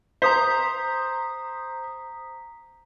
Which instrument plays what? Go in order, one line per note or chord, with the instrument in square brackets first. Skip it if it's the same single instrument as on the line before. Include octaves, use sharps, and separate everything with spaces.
[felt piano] C5 [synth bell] A#5 D#6 B6